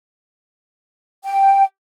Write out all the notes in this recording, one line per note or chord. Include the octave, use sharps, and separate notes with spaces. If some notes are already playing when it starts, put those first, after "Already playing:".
G5